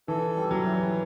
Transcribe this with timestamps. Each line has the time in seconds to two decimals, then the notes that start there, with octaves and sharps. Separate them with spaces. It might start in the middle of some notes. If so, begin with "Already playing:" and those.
0.08 E3 A4
0.36 G3
0.51 F#3
0.65 E3